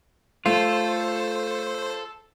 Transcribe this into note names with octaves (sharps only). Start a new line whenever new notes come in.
A3 F4 A4 C5